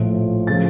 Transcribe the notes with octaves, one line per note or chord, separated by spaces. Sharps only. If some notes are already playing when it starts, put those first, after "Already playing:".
Already playing: A#1 A2 F3
C#3 F3 A6